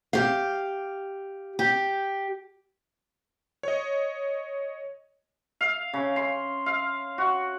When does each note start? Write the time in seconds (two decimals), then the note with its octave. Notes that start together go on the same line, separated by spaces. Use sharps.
0.13 G4 F5
1.59 G4
3.63 C#5 D#5
5.61 F5
5.93 C#3
6.16 C6
6.66 F5
7.18 F#4